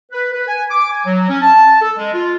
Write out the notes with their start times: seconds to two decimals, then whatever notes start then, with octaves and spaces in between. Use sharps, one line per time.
0.12 B4
0.33 B4
0.48 G#5
0.70 D6
0.91 G#5
1.06 F#3
1.30 C#4
1.42 A5
1.81 A4
1.97 G#3
2.14 F4